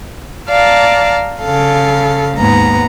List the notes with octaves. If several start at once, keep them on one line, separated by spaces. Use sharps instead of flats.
D5 F5 A5 A#5
C#3 A4 F5
D#2 G#2 B3 A#5